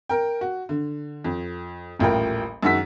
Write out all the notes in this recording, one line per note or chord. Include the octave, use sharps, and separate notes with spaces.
A#4 G5
F#4
D3
F2
D#1 A1 A2 F4 A#4 G5
F#2 D#3 G#3 F#4 E6 B6